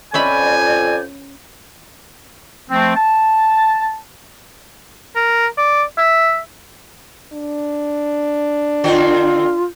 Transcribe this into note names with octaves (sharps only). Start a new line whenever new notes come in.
F2 C#4 D5 E5 G#5 B5 D6 G6
F3 A3 C4
A5
A#4
D5
E5
D4
D3 C4 F4 F#4